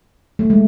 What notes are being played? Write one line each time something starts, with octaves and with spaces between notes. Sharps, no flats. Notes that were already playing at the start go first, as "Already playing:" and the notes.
A3
G#3